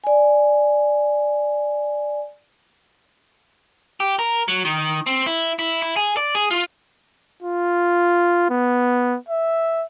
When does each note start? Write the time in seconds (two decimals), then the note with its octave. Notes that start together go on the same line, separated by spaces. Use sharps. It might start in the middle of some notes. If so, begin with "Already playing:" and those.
0.04 D5 G#5
4.00 G4
4.19 A#4
4.48 F#3
4.65 D#3
5.06 C4
5.26 E4
5.59 E4
5.82 E4
5.97 G#4
6.17 D5
6.35 G#4
6.51 F4
7.42 F4
8.50 B3
9.29 E5